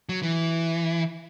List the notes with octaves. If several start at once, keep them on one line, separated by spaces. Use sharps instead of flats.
F#3
E3